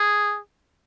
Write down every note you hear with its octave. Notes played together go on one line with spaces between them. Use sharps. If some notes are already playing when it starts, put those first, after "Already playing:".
Already playing: G#4